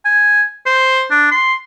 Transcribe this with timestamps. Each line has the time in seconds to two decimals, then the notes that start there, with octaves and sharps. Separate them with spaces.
0.05 G#5
0.66 C5
1.11 D4
1.31 C6